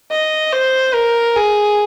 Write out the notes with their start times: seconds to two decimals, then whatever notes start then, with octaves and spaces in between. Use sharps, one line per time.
0.11 D#5
0.52 C5
0.94 A#4
1.36 G#4